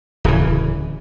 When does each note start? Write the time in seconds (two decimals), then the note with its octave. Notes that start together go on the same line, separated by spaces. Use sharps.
0.24 D1 C#3 E3